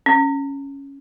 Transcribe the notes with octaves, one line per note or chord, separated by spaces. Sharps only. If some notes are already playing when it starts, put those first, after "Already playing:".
C#4